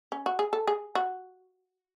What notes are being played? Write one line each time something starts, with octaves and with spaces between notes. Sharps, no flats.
C#4
F#4
G#4
A4
G#4
F#4